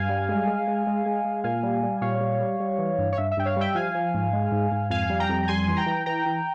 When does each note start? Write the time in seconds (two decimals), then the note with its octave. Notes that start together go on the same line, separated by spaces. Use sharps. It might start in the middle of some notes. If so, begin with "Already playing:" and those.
Already playing: G2 F5 G#5
0.09 G3
0.29 G#3
0.47 G#3
0.67 G#3
0.87 G#3
1.06 G#3
1.25 G#3
1.44 A#2 F5 G#5
1.63 G3
1.83 G3
2.01 A#2 C#5 F5
2.21 G3
2.41 G3
2.60 G3
2.78 E3
2.98 G2
3.12 C#5
3.17 G2 E5
3.31 E5
3.37 G2 G5
3.46 C#5 F5
3.56 G3 E5 G5
3.75 F3 F5 G#5
3.94 F3
4.14 G#2
4.33 G#3
4.52 G#2
4.71 G#2
4.90 F2 F5 G#5
5.10 G3
5.20 G5 A#5
5.29 F2
5.43 A#5
5.48 G3 G#5 C6
5.67 E3
5.76 G5 A#5
5.86 E3
6.06 E3 G5 A#5
6.26 E3